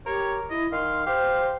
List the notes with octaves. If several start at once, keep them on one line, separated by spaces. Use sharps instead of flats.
G4 A#4 C#5
E4 D#5
D#3 F5 C6
G4 C5 F5